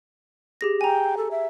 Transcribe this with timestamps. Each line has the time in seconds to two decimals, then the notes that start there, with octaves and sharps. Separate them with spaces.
0.61 G4 G#4 A#6
0.81 G5 G#5 A#5
1.17 A4
1.31 E5